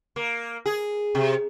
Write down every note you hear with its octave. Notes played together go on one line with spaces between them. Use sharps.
A#3
G#4
C3